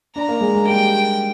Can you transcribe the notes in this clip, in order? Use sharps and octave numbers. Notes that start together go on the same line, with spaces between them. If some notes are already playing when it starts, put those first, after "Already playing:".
D4 A#5
A#3
G#3
G#3
G3 G5